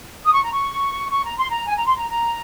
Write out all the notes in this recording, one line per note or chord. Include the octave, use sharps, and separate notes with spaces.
D#6
C#6
A#5
C#6
C#6
A#5
C6
A#5
G#5
A#5
C6
A#5
A#5